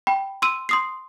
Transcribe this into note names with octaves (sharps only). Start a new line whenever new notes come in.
G5 B5
C6 E6 D#7
C6 D#6 C7